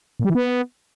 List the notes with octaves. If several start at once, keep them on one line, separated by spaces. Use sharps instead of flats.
A#2
G3
E3
B3